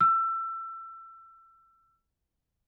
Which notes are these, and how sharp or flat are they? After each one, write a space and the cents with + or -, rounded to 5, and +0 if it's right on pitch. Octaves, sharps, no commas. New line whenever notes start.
E6 +25